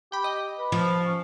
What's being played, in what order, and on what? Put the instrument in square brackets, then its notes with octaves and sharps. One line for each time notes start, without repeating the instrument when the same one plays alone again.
[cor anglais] G4 [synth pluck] G5 B5
[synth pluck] D#5
[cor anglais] B4
[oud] F3
[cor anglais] C#4